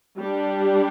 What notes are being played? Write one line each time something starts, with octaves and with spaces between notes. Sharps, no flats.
G3 D4